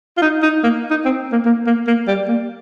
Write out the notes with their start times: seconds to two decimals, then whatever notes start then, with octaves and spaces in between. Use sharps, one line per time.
0.17 F4
0.22 D#4
0.42 D#4
0.63 A#3
0.90 D#4
1.05 C4
1.32 A#3
1.45 A#3
1.66 A#3
1.87 A#3
2.07 G3
2.28 A#3